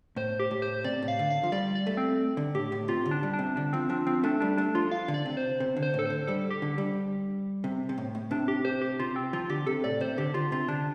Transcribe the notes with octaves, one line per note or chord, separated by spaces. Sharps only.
A2 C5
G4
A2
C5
C3 D5
A2
F5
D3
F5
F3
G3 D5
D5
A3
C4
D3
A2 G4
A2
C3 F4
D3
D4
G3
D4
C3
D3 D4
F3 C4
F3 D4
F3 C4
A3 D4
G3 D4
A3 D4
F3 F4
F5
D3
D5
C3
C5
C3
D3
C5
A2
A4
D3 C5
G3 A4
G4
D3
G3
C3
C3
A2
A2
C3 D4
G4
C5
G4
C3 F4
C4
F3 F4
D3 G4
C3 A4
A2 D5
C3 C5
D3 G4
D3 F4
C3 F4
D3 D4